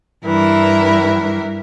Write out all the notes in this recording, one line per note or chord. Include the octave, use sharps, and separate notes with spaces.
G2 E3 A#4 E5